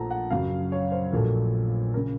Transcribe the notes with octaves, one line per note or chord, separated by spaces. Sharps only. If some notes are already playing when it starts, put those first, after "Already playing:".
Already playing: A#1 A#2 F3 A3 F#5 A5 A#5
F#5
F#2 C#3 F#3 F5
C#5
C5
A#1 A#2 F#3 A3 A#4
C#3 A#4